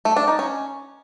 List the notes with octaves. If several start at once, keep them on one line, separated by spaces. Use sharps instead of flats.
A3
D4
D#4
C#4